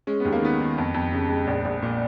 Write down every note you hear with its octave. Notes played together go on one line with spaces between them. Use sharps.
G#3 C#4
D#2 B3
A#3
D#3 B3
D#3
F2
F2
C#3
G#3
A#1
A#1
A#2